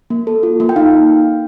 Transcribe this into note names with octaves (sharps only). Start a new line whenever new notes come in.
A#3
A4
F4
A#3
G5
D#4 F5